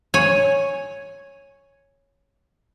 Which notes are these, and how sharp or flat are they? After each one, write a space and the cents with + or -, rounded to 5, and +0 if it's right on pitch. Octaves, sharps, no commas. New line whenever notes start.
C#5 +0 G#5 +0